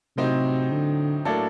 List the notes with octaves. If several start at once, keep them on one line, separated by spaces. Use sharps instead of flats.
A2 C3 F#3 C4 D#4 G4
D3
A2 F#3 A#3 D4 A4